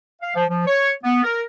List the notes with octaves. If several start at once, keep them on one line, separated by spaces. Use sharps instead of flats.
F5
F3
F3
C#5
B3
A#4